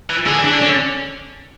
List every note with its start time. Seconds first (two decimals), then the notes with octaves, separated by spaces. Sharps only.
0.10 E3
0.26 D3 G#4
0.39 E3
0.44 D4
0.53 D3
0.62 C#4